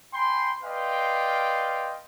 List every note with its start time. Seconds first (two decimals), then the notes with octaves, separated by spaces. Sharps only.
0.14 G5 G#5 B5 C6
0.63 B4 D5 D#5 F5 G5 C6